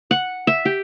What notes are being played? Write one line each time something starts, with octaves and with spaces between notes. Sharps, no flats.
F#5
E5
G4